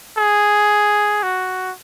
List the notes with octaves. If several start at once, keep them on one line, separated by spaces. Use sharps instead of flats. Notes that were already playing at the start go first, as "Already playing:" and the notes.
G#4
F#4